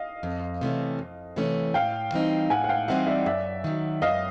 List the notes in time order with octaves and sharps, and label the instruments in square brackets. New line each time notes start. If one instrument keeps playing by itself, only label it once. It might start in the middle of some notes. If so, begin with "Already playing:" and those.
Already playing: [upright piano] D#5 F5
[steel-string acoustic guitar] F2
C3 E3 A3 C#4
F2
C3 E3 A3 C#4
[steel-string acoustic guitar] A2 [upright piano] F5 G5
[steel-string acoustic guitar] E3 G3 C4 D#4
[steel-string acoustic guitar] A2 [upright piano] F#5 G#5
[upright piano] F#5
F5 G5
[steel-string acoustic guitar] E3 G3 C4 D#4 [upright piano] E5 F#5
[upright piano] D5 E5
[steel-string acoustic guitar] F#2 [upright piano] D5 E5
[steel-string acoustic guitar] D#3 F#3
[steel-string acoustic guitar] F#2 [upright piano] D#5 F5